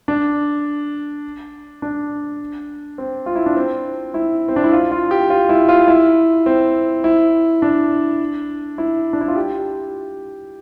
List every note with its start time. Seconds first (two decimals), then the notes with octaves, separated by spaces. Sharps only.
0.08 D4
1.82 D4
2.98 C4
3.26 F4
3.36 E4
3.46 D4
3.56 C4
4.14 E4
4.48 C4
4.56 D4
4.64 E4
4.73 F4
4.92 F4
5.11 G4
5.30 F4
5.49 E4
5.69 F4
5.88 E4
6.46 C4
7.04 E4
7.62 D4
8.78 E4
9.13 D4
9.21 E4
9.28 F4
9.36 G4